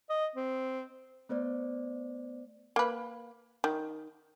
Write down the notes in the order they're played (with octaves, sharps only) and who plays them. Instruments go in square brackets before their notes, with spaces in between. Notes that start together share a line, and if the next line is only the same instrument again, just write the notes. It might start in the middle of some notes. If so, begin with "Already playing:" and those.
[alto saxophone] D#5
C4
[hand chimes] A3 B3 C5 D5
[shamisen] A#3 B4
D#3